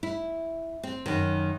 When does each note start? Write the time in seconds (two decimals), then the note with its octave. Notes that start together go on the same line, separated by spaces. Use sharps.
0.03 E4
0.83 C4
1.06 F#2 D#3